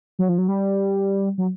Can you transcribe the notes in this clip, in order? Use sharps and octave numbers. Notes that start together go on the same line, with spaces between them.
F#3
F3
F#3
G3
F#3